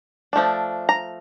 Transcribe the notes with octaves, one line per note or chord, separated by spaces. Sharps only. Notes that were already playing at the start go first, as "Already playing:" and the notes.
F3 A3 D4
A#5